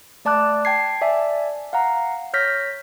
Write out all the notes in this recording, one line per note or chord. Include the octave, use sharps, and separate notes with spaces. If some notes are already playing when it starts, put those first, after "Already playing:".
A3 D5 A5 D6 F#6
G5 A5 G#6 C7
D5 E5 G#5 A5
F5 F#5 A#5
C#5 F6 G6 A#6 B6